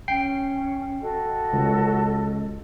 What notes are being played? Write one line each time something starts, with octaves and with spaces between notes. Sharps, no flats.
C#4 G5 C7
F#4 A4 D#5
C#2